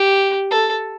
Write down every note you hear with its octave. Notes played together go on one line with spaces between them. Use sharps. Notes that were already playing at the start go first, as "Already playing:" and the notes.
Already playing: G4
A4